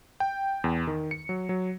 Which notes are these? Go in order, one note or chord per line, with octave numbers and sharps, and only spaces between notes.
G5
E2
D#3
C#7
F#3
F#3